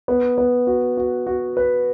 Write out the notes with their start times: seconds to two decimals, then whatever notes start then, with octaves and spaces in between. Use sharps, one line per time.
0.08 B3
0.38 B3
0.67 F#4
0.97 F#4
1.27 F#4
1.57 B4